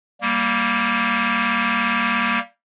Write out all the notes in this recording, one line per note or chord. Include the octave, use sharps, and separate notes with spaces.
G3 A#3